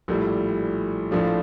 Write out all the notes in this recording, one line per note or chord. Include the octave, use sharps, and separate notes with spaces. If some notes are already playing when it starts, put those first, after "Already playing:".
A#1 A2 G3
A#1 A2 F3 A3 D4